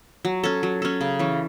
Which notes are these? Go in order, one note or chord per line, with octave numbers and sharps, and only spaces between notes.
F#3
C#4 A4
F#3
C#4 A4
C#3
E3 C#4